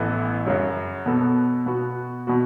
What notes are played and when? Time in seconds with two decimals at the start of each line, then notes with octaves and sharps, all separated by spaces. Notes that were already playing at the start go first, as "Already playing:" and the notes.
Already playing: A1 A2 E3 B3 A4
0.46 F#2 C#3 F#3
1.06 B2 B3 A4
1.66 B2 B3 F#4
2.27 B2 B3 F#4